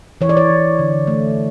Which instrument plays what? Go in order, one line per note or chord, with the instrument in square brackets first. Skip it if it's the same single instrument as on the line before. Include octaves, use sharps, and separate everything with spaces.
[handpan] E3 C#5
D5
C#5
E3
D3
A3